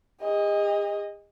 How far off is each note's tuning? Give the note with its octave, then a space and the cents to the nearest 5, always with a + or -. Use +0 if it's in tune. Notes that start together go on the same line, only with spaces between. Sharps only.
G#4 -45 D#5 +0